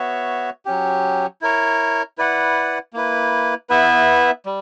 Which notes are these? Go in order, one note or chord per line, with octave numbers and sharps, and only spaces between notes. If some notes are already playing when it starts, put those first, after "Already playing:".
Already playing: B3 F#4 C#5 E5
F#3 C#4 G4
E4 A#4 C#5
E4 B4 D5 F#5
A#3 E4 B4
B3 E4 B4 E5
G3